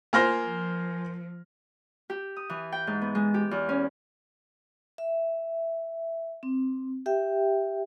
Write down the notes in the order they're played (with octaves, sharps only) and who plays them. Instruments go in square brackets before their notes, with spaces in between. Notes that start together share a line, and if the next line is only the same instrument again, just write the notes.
[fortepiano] A#3 F4 C5 [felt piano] G#5 F6 A#6
[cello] F3
[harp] G4
D#6
E3
G5
G#2
B3
G#3
G4
E2
C#4
[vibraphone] E5
C4
G4 E5 G5